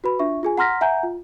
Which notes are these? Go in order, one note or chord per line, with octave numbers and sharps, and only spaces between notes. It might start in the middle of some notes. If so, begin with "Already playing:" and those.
F#4 B4 B5
D4 F4 E5 C#6
F4 G#4 G#5
F#5 A#5 C6 F6 A#6 B6
E5 F#5 G#5 A#5 G6
F4